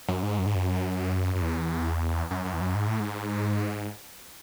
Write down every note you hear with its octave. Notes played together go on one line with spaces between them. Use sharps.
F#2
G#2
F#2
G#2
F#2
F#2
E2
F#2
F#2
E2
F#2
G#2
A2
G#2